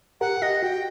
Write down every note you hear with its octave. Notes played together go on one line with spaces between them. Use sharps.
G4 A#4 F#5
G4 D#5
F#4 G5